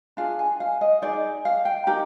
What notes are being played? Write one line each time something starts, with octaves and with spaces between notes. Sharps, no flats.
D4 F4 G#4 F5
G#5
F5
D#5
D#4 G#4 D5
F5
G5
D#4 G4 A#4 A#5